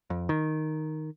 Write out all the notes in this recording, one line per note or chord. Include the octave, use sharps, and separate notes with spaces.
F2
D#3